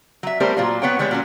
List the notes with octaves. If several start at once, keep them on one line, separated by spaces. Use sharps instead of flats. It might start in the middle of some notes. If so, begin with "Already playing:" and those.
F#3 E5
G3 A3 B3 G4 A#4 C5
A#2 F#3 F4
B3 B4 C#5 F#5 G5
E3 G3 G#3 B3 C#5
A#2 F#3 C#4